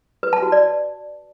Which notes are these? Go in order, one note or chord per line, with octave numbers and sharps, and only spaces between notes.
B4
A5
F#4
D5